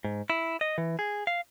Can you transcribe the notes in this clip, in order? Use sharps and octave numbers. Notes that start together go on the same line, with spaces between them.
G#2
E4
D#5
E3
G#4
F5